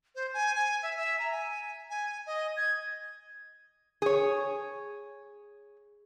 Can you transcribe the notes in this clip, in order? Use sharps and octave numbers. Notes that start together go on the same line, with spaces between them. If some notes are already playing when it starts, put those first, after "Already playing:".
C5
G#5
G#5
E5
E5
A#5
G#5
G#5
D#5
G#6
G#4 C#5